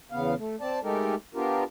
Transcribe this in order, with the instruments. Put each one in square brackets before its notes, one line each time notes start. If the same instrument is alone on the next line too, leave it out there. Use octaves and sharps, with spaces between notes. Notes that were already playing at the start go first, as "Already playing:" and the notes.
[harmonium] E2 C#3 B3 F5
A3
C4 D5 A5
G#3 A3 D#4 G4 A4 A#4
B3 D4 F4 G4 A#4